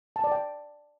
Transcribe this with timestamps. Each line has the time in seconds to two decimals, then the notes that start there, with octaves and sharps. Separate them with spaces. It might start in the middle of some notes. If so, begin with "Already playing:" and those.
0.16 A5
0.24 D5
0.32 G5